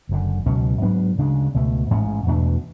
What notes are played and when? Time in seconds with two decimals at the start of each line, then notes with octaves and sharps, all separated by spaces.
0.09 F#1 F#2 D3
0.46 C#2 B2 F#3 C#4
0.82 G#2 F#3 B3 D4
1.18 D2 C#3 G#3 D4
1.54 C#2 B2 A3
1.91 A1 G#2 G#3 C#4
2.27 E2 B2 A3 D4